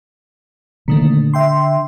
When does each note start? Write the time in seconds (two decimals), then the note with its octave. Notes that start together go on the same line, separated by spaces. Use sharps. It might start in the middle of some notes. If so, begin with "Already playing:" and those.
0.88 A#2 D3 D#3 A3
1.34 E5 G5 C6